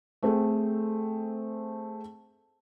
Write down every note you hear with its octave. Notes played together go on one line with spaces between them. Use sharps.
A3 C4 G#4 A4